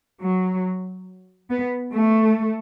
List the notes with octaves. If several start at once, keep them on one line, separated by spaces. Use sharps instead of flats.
F#3
B3
A3